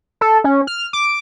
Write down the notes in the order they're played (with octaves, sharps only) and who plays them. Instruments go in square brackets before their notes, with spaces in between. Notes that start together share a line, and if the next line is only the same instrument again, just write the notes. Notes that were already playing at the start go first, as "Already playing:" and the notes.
[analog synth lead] A4
C#4
F6
D6